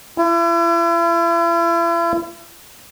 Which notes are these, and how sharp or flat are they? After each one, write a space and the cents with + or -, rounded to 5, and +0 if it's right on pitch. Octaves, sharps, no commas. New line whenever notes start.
E4 +40